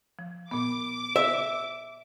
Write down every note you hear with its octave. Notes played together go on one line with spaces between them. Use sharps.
F3
A#2 B3 D6
E5